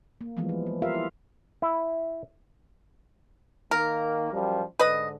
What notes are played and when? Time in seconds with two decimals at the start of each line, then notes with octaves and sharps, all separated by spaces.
0.21 A#3
0.37 E3 F3 G3 G#3 B3
0.49 F3
0.66 B3
0.82 F4 G4 A#4 E5 F5
0.95 E4
1.62 E4
3.71 D#3 A#3 A#4
4.32 F#2 F3 G3
4.79 G#2 D3 B4 D#5